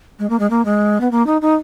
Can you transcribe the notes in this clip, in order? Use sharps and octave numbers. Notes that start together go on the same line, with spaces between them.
G#3
A#3
G#3
A#3
G#3
B3
A#3
D#4
D#4